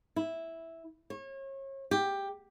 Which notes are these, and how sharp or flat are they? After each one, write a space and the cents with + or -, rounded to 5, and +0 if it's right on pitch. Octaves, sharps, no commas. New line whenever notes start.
E4 -5
C#5 -35
G4 +10